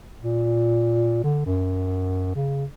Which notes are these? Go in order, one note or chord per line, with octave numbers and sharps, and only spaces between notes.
A#2
D3
F#2
C#3